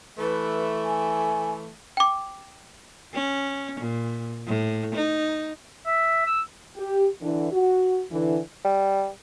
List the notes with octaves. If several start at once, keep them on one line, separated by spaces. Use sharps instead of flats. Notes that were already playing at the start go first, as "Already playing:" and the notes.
E3 A3 B4
G#5
G5 D6
C#4
A#2
A2
D#4
E5
E6
G4
D3 E3
F#4
D3 E3
G3